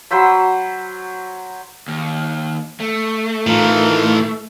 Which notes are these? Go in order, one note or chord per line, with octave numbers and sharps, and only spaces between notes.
F#3 C5 B5 E6
D#2
A3
A2 E3 D#4 F4 A#4